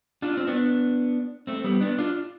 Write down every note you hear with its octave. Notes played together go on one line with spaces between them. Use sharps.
D4 F4
C4
B3 D4
A3 C4
G3 B3
B3 D4
D4 F4